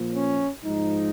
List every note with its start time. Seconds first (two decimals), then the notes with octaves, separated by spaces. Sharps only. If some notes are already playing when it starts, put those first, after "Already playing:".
Already playing: A#2 F3
0.14 C#4
0.64 G#2 F3 D#4